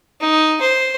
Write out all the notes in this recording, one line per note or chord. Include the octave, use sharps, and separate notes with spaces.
D#4
C5